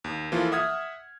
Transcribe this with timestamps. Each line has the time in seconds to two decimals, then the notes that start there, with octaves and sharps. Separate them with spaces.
0.04 D#2
0.32 E3 F3 A#3 F4 A4
0.52 E5 F#5 D#6 F6 G#6